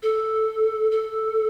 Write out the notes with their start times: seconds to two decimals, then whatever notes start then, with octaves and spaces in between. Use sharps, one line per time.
0.03 A4
0.91 A4